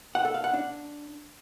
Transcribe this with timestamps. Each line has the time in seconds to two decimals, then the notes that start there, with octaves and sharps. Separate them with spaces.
0.15 F#5
0.25 A4
0.34 F5
0.44 F#5
0.54 D4